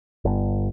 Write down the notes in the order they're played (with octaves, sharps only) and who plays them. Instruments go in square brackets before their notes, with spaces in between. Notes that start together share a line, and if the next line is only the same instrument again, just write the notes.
[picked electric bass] G1